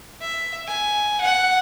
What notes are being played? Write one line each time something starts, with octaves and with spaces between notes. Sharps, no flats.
E5
G#5
F#5